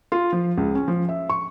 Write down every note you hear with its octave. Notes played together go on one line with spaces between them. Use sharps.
F4
F3
C#2
C#4
F3
E5
C#6